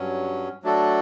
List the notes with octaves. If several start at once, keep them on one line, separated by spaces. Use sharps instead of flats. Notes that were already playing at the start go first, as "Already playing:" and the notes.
Already playing: G2 F#3 C#4
F#3 A3 D4 F#4 A4